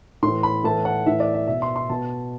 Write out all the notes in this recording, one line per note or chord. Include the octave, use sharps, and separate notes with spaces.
A2 E3 C6
B5
A2 E3 A5
F#5
A2 E3 E5
D5
E5
B2 E5
C6
C6
B2 A5